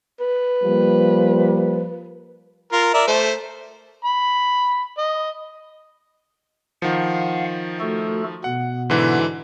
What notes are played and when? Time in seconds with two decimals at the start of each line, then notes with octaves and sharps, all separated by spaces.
0.20 B4
0.64 F3 G3 A#3
2.72 F4 A#4
2.94 A#4 D5 E5
3.07 A3 C5
4.05 B5
4.98 D#5
6.82 D#3 F3 F5 F#5
7.80 A3 F#4 A4
8.44 B2 B3 F#5
8.90 G#2 D3 E3